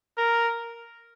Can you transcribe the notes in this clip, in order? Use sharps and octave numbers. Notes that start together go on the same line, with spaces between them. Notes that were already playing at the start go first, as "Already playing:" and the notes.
A#4